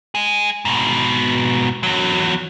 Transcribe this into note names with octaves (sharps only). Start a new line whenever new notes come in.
G#3 G#4
G#2 B2
E2 F#3